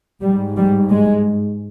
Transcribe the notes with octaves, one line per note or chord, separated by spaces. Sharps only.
G#2 G3
G3
G#3